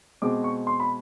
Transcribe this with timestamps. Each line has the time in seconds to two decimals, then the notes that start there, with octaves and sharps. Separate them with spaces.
0.22 B2 G#3 C4 D6
0.44 C#6
0.67 C6
0.80 B5